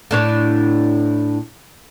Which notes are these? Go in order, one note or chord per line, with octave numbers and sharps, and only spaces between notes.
A2 D4 C#5